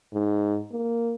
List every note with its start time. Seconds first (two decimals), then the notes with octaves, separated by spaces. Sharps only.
0.13 G#2
0.72 A#3